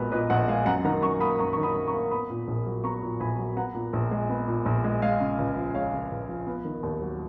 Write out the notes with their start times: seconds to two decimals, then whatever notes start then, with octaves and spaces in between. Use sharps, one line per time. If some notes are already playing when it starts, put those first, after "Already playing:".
Already playing: A#1 A#2 G#3 B3 F#4 A#4
0.12 A#2 B4 D#5
0.30 A#1 D#5 F#5
0.48 G#3 F5 G#5
0.66 F#2 F#5 A#5
0.85 D#3 F#5 A#5
1.02 F#2 A#5 C#6
1.20 A#3 B5 D#6
1.38 F#2 A#5 C#6
1.53 D#3 C#6
1.63 B5 D#6
1.76 F#2
1.87 A#5 C#6
1.93 A#3
2.11 B3 B5 D#6
2.30 A#2
2.48 A#1
2.66 F#3
2.84 B3 A#5 C#6
3.03 A#2
3.20 A#1 G#5 B5
3.39 F#3
3.57 B3 F#5 A#5
3.74 A#2
3.93 A#1
4.11 G#3
4.29 B3
4.48 A#2
4.66 A#1
4.84 G#3
5.02 G#3 F5 G#5
5.20 C#3
5.39 C#2
5.56 F3
5.74 G#3 C#5 F5
5.93 C#3
6.12 C#2
6.29 F3
6.47 B3
6.65 D#3
6.83 D#2
7.02 F#3